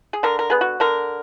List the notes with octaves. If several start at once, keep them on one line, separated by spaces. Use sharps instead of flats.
G#4
D3 A#4
A#4
B3 G#4
F#4
D3 A#4